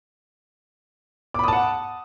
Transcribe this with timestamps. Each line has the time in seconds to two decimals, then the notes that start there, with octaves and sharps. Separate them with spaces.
1.34 D6
1.39 B5
1.44 D#6
1.48 A5
1.53 F#5